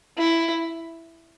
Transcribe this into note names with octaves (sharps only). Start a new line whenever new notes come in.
E4